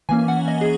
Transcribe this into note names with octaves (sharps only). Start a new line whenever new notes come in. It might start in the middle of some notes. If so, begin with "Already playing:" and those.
E3 A#3 C#4 G#5
F#5
D#5
G#4